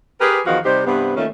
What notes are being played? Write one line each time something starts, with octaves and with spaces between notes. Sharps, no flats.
G4 G#4 A#4 B4
E2 D#3 F3 F#4 F5
C3 G3 D#4 G4 C5
G2 C3 B3
D#3 A3 A#3 C#4 F4